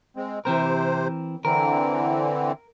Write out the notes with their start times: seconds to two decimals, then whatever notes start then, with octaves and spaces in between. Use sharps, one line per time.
0.16 G#3 C4
0.45 C3 E3 C4 A#4 C5
1.45 D3 E3 C4 A#4